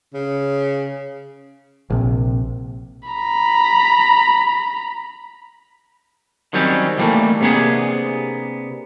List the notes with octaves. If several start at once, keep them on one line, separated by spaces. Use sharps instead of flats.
C#3
A#1 C3
A#5 B5
D#3 F#3 G3 C4 C#4
D3 E3 F#3 G3 A3 A#3
C3 A#3 B3 D4 G#4